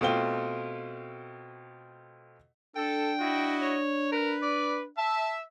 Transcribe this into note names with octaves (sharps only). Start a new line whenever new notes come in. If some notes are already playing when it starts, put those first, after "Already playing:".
B2 A3 C4 F4 G7
D4 A4 G5
E4 F#4 D#5
C#5
A#4 B4
D5
E5 A5